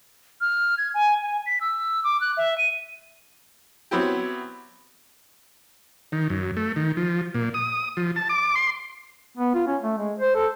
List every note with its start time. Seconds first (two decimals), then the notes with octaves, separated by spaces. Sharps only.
0.41 F6
0.78 G#6
0.94 G#5
1.23 G#5
1.46 B6
1.61 E6
2.04 D6
2.21 F#6
2.37 E5
2.58 D#7
3.91 F#3 B3 C4 E4 G4
6.12 D#3
6.30 F#2
6.57 A3
6.76 D#3
6.97 F3
7.34 A#2
7.54 D#6
7.97 F3
8.16 A5
8.29 D6
8.55 C6
9.37 B3
9.54 F4
9.67 C#4
9.83 A3
9.98 G#3
10.19 C5
10.35 A4